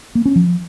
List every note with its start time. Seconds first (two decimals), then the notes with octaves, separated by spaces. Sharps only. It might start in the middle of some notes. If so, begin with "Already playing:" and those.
0.15 A#3
0.26 C#4
0.36 F3